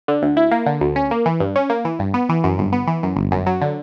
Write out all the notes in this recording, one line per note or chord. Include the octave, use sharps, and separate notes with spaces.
D3
D2
E4
A#3
D3
D2
C#4
A#3
E3
G2
C#4
A#3
E3
G2
B3
E3
F#2
G1
B3
E3
F#2
G1
F#2
F#3
D3